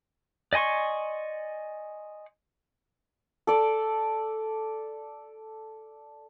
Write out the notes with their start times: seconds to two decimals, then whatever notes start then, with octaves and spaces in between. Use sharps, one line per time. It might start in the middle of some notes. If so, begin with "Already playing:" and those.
0.53 D5 D#5 G#5 C6 C#6
3.47 A4 D5